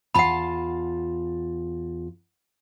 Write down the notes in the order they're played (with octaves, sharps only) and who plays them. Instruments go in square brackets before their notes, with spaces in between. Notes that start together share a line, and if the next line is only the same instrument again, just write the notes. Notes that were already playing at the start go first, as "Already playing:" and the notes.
[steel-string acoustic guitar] E2 F4 A5 [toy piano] F#5 B5